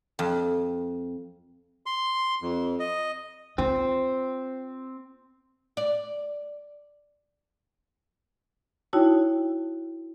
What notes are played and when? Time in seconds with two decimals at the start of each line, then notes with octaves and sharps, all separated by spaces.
0.19 F2
1.86 C6
2.42 F2
2.80 D#5
3.58 C4 F4
5.77 D5
8.93 D#4 E4 F#4 C#5 G5 A5